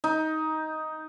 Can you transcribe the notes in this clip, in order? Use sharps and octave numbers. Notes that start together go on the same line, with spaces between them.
D#4